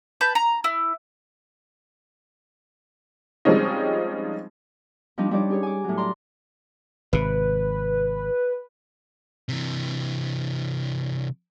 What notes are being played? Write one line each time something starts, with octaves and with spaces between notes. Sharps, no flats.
B4 A5 G6
A#5
E4
F3 G3 G#3 C4 C#4 D#4
F3 G3 D4 D#4
G3 D4 D#4 C#5 D5
C#4 G4 G#4 C#5
G#5 D6
A2 F#3
D5 A#5 C6
G#1 C3 B4
C3 E3